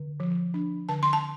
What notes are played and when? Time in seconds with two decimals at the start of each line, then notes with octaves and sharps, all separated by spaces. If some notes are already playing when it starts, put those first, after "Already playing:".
Already playing: D3
0.20 F3
0.54 D4
0.89 D3 A5
1.03 C6
1.13 A5